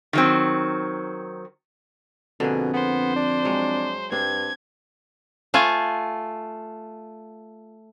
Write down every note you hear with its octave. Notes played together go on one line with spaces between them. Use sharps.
D#3 F#3 C4
F2 B2 D3 A#3 G#4
B3 C5
D4
F#3 G#3
G2 C4 D4 G#6
A3 F4 G#5